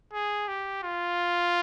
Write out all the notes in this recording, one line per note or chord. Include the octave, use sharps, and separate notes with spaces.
G#4
G4
F4